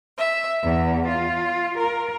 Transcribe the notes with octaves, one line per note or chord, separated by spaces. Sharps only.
E5
E2
F4
A#4